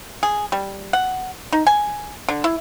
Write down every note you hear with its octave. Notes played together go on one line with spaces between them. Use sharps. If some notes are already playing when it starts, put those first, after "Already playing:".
G#4
G3
F#5
D#4
G#5
D3
E4